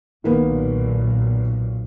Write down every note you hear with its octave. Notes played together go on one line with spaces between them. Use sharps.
B1 A#2 D#3 A#3 B3